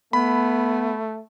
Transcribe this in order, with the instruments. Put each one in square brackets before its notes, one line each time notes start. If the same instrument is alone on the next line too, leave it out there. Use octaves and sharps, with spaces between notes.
[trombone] A3 [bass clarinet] B3 [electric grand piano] B5